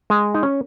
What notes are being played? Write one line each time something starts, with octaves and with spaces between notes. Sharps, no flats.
G#3
D#4
C#4